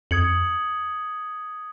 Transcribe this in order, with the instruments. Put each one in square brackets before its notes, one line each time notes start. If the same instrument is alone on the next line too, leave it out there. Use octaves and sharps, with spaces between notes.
[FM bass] F2 [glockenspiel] D#6 G#6 C#7 F#7